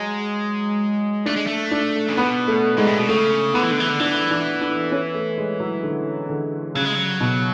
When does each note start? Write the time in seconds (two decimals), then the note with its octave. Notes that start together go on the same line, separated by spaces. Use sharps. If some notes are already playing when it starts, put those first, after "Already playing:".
Already playing: F#3 G#3
1.26 A3 D4
1.36 G#3
1.47 A3
1.71 D4
2.09 C#3
2.17 B2 B3
2.48 A3
2.77 G#2 G#3
2.87 A2
2.98 B2
3.08 C#3 A3
3.54 D3 B3
3.63 E3
3.71 D3
3.80 E3
3.89 D3
4.00 E3 D4
4.31 D4
4.61 D4
4.92 C#4
5.15 A3
5.38 G#3
5.60 F#3
5.83 D3
6.29 D3
6.75 C#3 F#3
6.85 G#3
6.95 F#3
7.21 B2